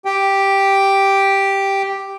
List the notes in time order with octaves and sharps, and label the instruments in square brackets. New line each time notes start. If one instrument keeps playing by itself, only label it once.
[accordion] G4 G5